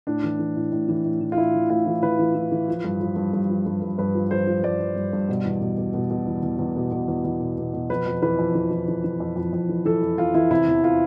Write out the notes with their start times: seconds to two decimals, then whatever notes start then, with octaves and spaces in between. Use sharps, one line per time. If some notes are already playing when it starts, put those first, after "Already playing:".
0.07 A2 D4
0.24 E3
0.39 E3
0.56 A2
0.72 A2
0.88 E3
1.04 A2
1.21 E3
1.32 F4
1.37 A2 E4
1.54 E3
1.69 A2 F4
1.86 E3
2.02 E3 B4
2.19 E3
2.35 E3
2.52 E3
2.68 F3
2.84 G2
3.00 F3
3.16 G2
3.33 G2
3.49 F3
3.66 G2
3.82 G2
3.98 G2 B4
4.15 F3
4.31 F3 C5
4.47 F3
4.63 G2 D5
4.80 F3
4.96 G2
5.13 G2
5.29 B2
5.45 E2
5.61 B2
5.78 B2
5.94 B2
6.10 B2
6.27 E2
6.43 E2
6.59 E2
6.76 B2
6.92 B2
7.08 E2
7.24 E2
7.41 B2
7.58 B2
7.74 B2
7.90 F2 B4
8.06 F2
8.22 E3 B4
8.39 F2
8.55 E3
8.71 E3
8.88 E3
9.04 E3
9.20 F2
9.36 F2
9.53 F2
9.69 E3
9.85 E3 A4
10.02 F2
10.18 F2 F4
10.34 E3 E4
10.50 C3 E4
10.67 E2
10.84 F4